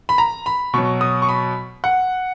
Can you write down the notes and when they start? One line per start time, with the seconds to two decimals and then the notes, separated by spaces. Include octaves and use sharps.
0.09 B5
0.18 A#5
0.46 B5
0.74 B2 F#3 C#6
1.01 D#6
1.22 C#6
1.29 B5
1.84 F#5